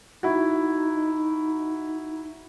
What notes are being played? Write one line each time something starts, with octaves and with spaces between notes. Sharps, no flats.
D#4 E4 F#4